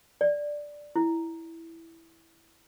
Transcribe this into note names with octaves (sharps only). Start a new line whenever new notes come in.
D5
E4